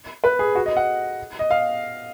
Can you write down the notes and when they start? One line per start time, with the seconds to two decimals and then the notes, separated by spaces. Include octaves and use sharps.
0.24 B4
0.39 G#4
0.55 F#4
0.66 D#5
0.77 F#5
1.39 D#5
1.51 F5